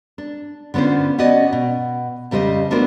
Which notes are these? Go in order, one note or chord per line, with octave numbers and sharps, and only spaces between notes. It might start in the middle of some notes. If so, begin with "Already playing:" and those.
D4
D3 B3 C#4 F4 C5
B3 C#4 F#4 D5 D#5
B2
F2 C#3 G3 C5 D#5
A3 B3 D4 F#4 A#4 C5